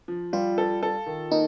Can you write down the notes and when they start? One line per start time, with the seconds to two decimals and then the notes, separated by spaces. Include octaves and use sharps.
0.08 F3
0.33 G3 F4
0.58 A4
0.83 A4
1.06 D#3
1.31 A#3 D#4